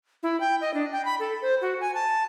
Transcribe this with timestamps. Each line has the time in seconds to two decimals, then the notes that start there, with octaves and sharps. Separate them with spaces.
0.23 E4
0.40 G5
0.61 D#5
0.74 D4
0.92 G5
1.05 B5
1.19 A4
1.42 C5
1.61 F#4
1.81 G#5
1.94 A5